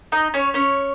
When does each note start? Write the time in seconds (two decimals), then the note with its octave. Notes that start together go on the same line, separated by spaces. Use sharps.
0.12 D#4 D#5
0.34 C#4 C#5
0.54 C#4 C#5